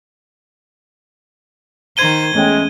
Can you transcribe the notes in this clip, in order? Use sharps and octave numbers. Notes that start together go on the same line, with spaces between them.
D#3 C5 G#6 D#7 G7
E2 G#3 A3 C#4 G5